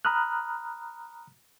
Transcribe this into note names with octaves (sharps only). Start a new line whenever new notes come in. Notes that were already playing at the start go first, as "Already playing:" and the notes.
A#5 B5 D#6 F6 F#6